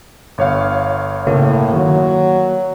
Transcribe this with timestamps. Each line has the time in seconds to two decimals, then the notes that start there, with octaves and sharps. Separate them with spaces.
0.38 G1 C#5 F5
1.27 A2 C#3 A#3
1.74 D#3 F#3